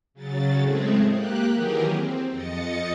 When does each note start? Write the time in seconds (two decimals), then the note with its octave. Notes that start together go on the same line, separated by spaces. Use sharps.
0.14 C#3 F#3 A6
0.59 A2 G#3 A3 C4 G#4
1.10 A#3 G4 F#6
1.53 D#3 E3 F#3 G4 G#4 A#4
1.89 C4
2.29 F2 D#5 A6 C#7